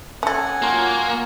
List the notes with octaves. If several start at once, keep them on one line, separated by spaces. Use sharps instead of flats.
C#4 A4 F#5 G#5
F#3 A#3 D#4 F4